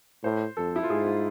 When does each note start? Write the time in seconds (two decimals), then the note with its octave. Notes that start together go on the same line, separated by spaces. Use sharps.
0.24 A2 C5
0.57 F2 A4
0.76 E4
0.83 F4
0.90 G#2 G#4
1.06 F4